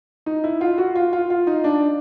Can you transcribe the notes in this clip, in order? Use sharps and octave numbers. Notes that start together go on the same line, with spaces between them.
D#4
E4
F4
F#4
F4
F4
F4
D#4
D4